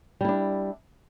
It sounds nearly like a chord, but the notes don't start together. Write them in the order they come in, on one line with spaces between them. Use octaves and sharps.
G3 E4 D4